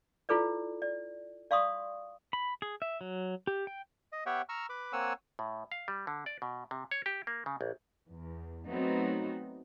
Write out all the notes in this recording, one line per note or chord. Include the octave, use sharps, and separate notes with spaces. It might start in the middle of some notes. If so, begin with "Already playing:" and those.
E4 F4 A4 B4 D5
D5
D5 F5 C6 C#6 D#6
B5
G#4
E5
F#3
G4
G5
D#5
B3 G4 C#5 E5 F#5 G5
A#5 C#6 E6 F6
B4 B5 D6
A#3 C4 C#5 F#5 G#5 E6
A2
F5
G3
D3
D5
B2
C3
C#5
G4
A#3
C#3
A#1
E2
F#3 A3 B3 C4 D#4 F#4